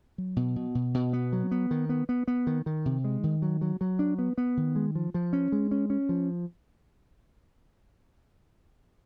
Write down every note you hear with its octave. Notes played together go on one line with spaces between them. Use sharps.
F#3
B2
B2
B2
B2
B3
F#3
B3
D#3
B3
B3
B3
D#3
D#3
C3
G#3
D#3
F#3
F#3
F#3
D4
B3
B3
D#3
G#3
F3
F3
C#4
G#3
C#4
C#4
F3